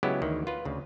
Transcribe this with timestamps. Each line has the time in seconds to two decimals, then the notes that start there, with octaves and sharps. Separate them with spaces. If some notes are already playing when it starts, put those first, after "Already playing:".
0.03 C#3 F#3 G#3 B3 E4 G4
0.22 D2 D#3 E3
0.47 F4 B4
0.65 D2 C#3